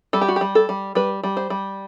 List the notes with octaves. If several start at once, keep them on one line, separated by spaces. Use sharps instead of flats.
G3 A4
G4
F#4
G4
G3
A4
G3
G3 B4
G3
C5
G3